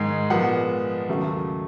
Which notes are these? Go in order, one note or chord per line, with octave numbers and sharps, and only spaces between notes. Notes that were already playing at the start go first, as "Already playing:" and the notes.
Already playing: G#2 D#3 G#3
A#2 F3 G#3 B3 F#5
D#2 C#3 F#3 A3